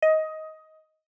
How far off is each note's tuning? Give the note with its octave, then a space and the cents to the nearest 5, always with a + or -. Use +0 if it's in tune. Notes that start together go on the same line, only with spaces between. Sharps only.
D#5 +15